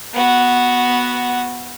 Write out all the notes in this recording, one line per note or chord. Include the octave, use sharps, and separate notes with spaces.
B3 F#4